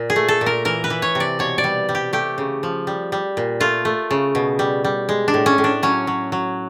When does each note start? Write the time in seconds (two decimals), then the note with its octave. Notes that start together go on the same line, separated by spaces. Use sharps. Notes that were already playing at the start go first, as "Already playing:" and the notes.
Already playing: A#2
0.10 G#4
0.16 A3
0.28 A4
0.41 A#2
0.46 A#4
0.65 E3 A#4
0.84 B4
0.90 E3
1.02 C#5
1.15 C3
1.20 D5
1.39 B2 C#5
1.58 D5
1.64 G3
1.89 G3
1.95 G4
2.13 A3 G4
2.38 C#3
2.63 F3
2.87 G3
3.12 G3
3.37 A#2
3.60 A3 F4
3.85 A3
4.11 C#3
4.35 B2
4.59 G3
4.84 G3
5.09 G#3
5.28 D4
5.34 A2
5.46 C#4
5.58 A2
5.64 D4
5.83 F#3 C#4
6.07 F#3
6.32 F#3